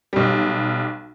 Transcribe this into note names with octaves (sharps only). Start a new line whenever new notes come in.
B1 G3